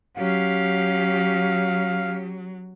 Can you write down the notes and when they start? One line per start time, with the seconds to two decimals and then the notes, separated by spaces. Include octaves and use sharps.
0.17 F#3 C#4 G4 F5